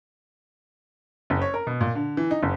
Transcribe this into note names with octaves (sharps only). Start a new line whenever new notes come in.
F#1
C#5
A#4
B2
A#2
D3
E3
D#4
F#1